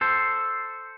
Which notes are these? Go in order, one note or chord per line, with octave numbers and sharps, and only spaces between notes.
A4 C5